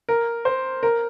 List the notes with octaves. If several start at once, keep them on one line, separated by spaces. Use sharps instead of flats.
A#4
C5
A#4